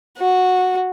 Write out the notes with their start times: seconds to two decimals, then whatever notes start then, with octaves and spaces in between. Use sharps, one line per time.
0.18 F#4